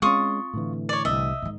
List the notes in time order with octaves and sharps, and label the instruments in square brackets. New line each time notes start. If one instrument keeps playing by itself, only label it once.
[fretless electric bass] G#3 C#4 [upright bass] C4 [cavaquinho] F4 C#6 D#6
[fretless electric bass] A2 D3 E3
[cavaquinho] C#5 D5
[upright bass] C2 [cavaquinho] D#5 E5
[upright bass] G#2 D#3